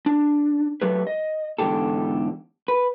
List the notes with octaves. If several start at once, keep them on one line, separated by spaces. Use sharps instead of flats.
D4
F#3 A3 G4 B4
D#5
E2 G#2 B2 D3 G4 A4
B4